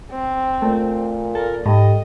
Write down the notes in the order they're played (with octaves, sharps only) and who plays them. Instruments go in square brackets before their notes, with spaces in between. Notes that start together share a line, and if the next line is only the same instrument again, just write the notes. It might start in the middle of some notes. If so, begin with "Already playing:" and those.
[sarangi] C4
[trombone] A#2 [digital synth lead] A3
[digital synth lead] A4 [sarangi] A#4
[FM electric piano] G#2 [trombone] G4 [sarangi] D#5